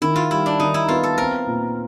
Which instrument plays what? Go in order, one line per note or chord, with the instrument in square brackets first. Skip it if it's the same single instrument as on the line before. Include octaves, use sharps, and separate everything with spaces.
[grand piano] D#3 [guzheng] E4
[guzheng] F4
[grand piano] G3 [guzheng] E4
[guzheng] D4
[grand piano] D#3 [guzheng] D#4
[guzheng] E4
[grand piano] B3 [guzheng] F4
[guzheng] A4
[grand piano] C4 [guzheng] A#4
[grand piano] A#2